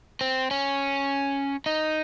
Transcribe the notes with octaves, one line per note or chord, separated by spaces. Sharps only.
C4
C#4
D#4